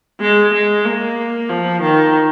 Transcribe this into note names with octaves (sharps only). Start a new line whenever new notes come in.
G#3
G#3
A#3
F3
D#3